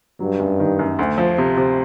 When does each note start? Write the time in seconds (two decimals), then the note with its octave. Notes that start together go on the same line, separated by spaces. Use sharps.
0.20 G2 F#3
0.40 F#2
0.60 D#3
0.79 F#2
0.99 D2
1.18 F3
1.38 C3
1.57 C3